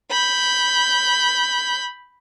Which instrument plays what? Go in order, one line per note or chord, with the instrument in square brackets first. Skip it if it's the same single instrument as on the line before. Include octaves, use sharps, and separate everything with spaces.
[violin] B5 G6